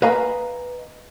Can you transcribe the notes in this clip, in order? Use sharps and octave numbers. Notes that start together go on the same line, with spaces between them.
B4 D#5 F5 G#5 A#5 B5